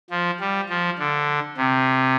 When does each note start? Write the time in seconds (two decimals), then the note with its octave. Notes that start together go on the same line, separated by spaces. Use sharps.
0.10 F3
0.40 G3
0.70 F3
0.98 D3
1.57 C3